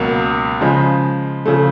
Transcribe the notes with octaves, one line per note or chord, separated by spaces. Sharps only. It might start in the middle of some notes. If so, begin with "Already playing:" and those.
Already playing: C#2 B2 F#3 A#3
C#3 F3 G#3
C#3 F3 A3